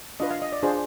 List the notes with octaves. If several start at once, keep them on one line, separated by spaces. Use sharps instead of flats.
D4 F4 B4 D#5
F5
D#5
D5
D4 F4 G#4 C5